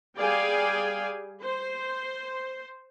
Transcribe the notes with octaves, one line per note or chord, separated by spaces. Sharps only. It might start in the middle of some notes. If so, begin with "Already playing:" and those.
G3 G#4 D5 F5 G5 G#5
C5